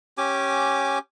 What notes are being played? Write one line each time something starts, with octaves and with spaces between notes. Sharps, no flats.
C#4 G4 G#5 D6